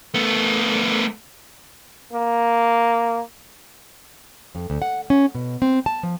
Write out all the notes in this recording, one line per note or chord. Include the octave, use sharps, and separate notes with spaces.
A3 B3
A#3
F2
D2
F#5
C#4
B2
C4
A5
F3